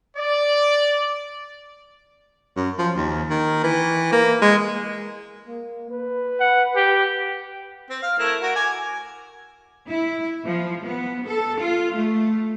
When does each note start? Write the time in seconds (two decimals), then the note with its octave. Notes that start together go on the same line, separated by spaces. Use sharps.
0.17 D5
2.56 F#2
2.78 F3
2.96 D#2
3.30 D#3
3.64 E3
4.12 A#3
4.42 G#3
5.47 A#3
5.91 B4
6.40 F#5
6.76 G4
7.90 C4
8.02 F5
8.19 A3 E4 A#4
8.41 F#4 A#4
8.56 G#5 D6
9.89 E4
10.45 F3
10.83 B3
11.26 A4
11.59 F4
11.94 A3